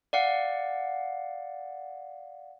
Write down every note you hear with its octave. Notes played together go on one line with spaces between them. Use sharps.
D5 F5 F#5